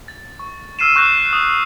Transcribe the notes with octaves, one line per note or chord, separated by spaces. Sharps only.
A6
C#6
E6 F6 C7 D#7 E7
C#6 F#6 G6 A#6 D#7 E7
D#6